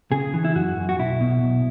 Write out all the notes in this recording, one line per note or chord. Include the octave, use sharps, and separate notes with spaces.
C#3 G#4
E3
E4
F#2 F#4
F#2
F#4
B1 E4
B2
B1